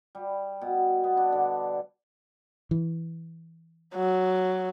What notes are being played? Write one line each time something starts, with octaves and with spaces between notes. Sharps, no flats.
G3
B2
B3
D4
D3
E3
F#3